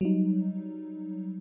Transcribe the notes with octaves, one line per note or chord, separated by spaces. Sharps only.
F#3 G3 D#4